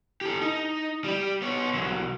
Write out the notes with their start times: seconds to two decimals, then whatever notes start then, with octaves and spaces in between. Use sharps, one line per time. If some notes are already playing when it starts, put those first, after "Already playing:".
0.21 G4 A4
0.41 D#4
1.04 G3 G4
1.42 B3 C#5
1.73 C2 F#3